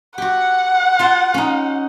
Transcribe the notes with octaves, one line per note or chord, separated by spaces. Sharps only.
F#4 G4 F#5
F4 F5 A5
C#4 D#4